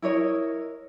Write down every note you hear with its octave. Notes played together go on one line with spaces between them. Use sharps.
E4 A#4 C#5 D#5